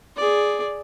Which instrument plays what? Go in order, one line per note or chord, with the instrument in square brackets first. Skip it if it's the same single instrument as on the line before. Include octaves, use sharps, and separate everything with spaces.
[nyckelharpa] G#4 D5